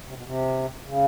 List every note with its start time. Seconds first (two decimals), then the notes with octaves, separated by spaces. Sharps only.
0.05 C3
0.14 B2
0.24 C3
0.84 C#3